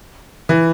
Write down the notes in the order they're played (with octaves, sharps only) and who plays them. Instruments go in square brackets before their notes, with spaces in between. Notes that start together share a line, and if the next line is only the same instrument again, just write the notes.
[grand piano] E3